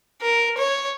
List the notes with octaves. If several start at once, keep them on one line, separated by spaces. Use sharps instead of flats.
A#4
C#5